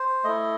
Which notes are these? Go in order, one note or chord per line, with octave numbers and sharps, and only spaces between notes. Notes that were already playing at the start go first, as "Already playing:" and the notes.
Already playing: C5
A3 E4 D#5